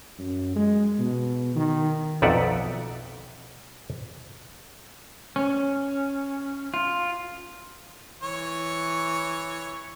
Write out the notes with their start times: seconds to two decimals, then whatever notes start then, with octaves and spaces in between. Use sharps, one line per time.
0.19 F#2
0.56 G#3
0.99 B2
1.55 D#3
2.22 B1 F2 D#4 D5 E5 F#5
5.36 C#4
6.74 F4
8.23 E3 C#5 C#6